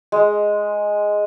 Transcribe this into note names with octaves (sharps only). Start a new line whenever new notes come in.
G#3